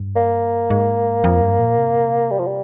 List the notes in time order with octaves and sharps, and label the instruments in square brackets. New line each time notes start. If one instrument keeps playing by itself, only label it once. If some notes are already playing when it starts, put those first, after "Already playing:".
Already playing: [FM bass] G2
[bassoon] A#3
[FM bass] G#2
F2
G2
A#2
C3
[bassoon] G3
F3
G3